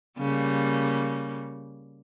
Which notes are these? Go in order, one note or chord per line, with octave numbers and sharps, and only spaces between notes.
C#3 G3 A#3